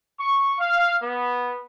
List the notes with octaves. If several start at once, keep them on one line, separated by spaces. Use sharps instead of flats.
C#6
F5
B3